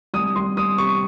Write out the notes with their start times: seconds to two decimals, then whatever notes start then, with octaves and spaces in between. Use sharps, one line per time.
0.14 C2 D#6
0.36 C2 C6
0.57 C2 D#6
0.78 C3 C#6